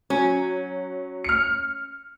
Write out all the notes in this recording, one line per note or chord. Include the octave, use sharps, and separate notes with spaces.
F#3 C#4
F6 C#7